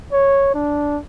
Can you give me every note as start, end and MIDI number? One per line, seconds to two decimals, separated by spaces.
0.13 0.50 73
0.55 0.99 62